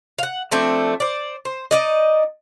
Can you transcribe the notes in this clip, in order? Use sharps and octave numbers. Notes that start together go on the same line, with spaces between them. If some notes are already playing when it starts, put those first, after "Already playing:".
F5 F#5
F3 A3 C4 D4
C5 D5
C5
D#4 D5 D#5